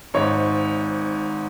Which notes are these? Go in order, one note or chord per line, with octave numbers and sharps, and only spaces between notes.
G#1 G#2 C#5